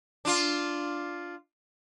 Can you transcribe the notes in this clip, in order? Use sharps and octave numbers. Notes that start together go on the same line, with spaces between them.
D4 F4